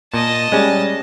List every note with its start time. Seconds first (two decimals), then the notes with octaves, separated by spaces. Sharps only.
0.14 A#2 D#5 A5
0.52 G3 G#3 C#4